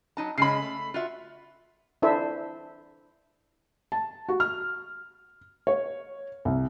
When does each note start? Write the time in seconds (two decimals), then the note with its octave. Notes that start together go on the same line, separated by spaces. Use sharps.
0.17 F#3 D#4 A5
0.38 C#3 G#3 C#4 B5 C7
0.62 A3
0.94 F4 F#4 E5
2.02 D4 E4 A4 C5 E5
3.92 A5
4.28 F#4
4.40 F6
5.67 C#5
6.45 C2